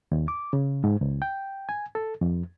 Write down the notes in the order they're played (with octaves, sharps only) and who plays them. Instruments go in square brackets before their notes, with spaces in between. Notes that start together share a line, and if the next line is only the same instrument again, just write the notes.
[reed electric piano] D#2
D6
C#3
G#2
C#2
G5
G#5
A4
F2